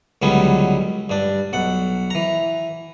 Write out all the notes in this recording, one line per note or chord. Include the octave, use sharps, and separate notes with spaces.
C#2 D3 F#3 G3 B3 C#4
G2 D4
B1 F#5
E3 A#5